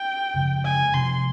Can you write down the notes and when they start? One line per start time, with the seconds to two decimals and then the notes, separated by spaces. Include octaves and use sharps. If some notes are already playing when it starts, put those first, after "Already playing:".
Already playing: G5
0.34 F#2 C#3 F3 G#3
0.65 G#5
0.94 C3 F3 G#3 C6